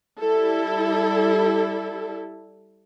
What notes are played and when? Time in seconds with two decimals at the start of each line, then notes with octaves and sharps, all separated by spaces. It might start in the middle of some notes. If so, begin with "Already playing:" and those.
0.19 G3 E4 A4